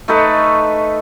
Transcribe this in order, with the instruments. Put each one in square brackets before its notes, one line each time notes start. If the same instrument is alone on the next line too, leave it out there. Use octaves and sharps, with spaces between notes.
[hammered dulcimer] A3 D#4 A4 B4